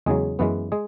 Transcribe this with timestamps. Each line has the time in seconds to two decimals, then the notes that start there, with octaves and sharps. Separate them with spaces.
0.06 E2 C#3 F#3 G#3 G#4
0.39 F#2 E3 G#3 B3 B4
0.72 G#3 G#4